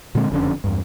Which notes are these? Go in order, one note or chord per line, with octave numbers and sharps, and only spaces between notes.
A#2 D3 G#3 C4
F#1 F2 D3 C#4
E2 G2